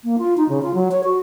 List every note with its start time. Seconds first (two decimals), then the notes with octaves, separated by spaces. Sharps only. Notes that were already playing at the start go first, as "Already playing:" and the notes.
0.04 A#3
0.18 F4
0.37 D#4
0.49 C#3
0.63 F4
0.74 F#3
0.91 C#5
1.04 F#4